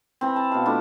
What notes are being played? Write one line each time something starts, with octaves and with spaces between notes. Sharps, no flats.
E3 C4
A5
B2 F5
A3 D4 E4 F4